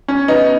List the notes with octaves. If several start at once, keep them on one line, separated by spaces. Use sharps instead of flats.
C#4
B3 D#4